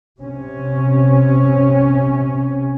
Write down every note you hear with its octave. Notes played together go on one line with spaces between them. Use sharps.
C3 C#4